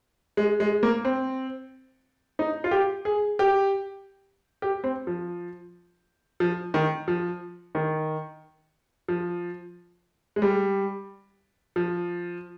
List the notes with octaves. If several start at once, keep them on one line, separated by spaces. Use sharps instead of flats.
G#3
G#3
A#3
C4
D#4
F4
G4
G#4
G4
G4
C4
F3
F3
D#3
F3
D#3
F3
G#3
G3
F3